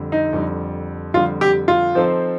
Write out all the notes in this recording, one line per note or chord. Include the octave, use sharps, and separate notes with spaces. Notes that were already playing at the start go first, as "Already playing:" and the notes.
Already playing: F2 D3 G3
D#4
F2 D3 G3
F2 D3 G3 F4
G4
F4
F3 C4 D#4 A4 C5